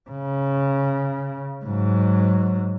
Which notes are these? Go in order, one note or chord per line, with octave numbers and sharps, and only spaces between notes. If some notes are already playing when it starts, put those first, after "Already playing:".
C#3
G#2 F#3